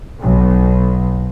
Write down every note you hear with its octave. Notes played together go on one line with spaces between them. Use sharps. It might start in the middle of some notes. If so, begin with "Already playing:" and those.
B1